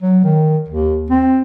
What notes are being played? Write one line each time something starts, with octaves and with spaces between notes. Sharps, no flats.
F#3
D#3
D#2
C4